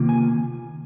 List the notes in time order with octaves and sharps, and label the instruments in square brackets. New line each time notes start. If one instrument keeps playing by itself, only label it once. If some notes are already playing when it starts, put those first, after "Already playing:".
Already playing: [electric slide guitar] C3 D#3 A#3 F4
G#5